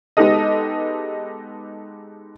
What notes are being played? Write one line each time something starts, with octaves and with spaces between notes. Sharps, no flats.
G#3 B3 D#4 G4 A4 D#5